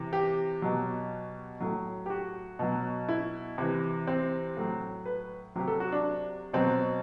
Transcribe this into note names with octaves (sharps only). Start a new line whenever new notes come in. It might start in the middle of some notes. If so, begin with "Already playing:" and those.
Already playing: C3 E3
G4
B2 F#3
A2 F#3
G4
F#4
B2 F#3
E4
C3 E3
C4
A2 F#3
B4
C3 F#3 G4
A4
F#4
D4
B2 F#3 C4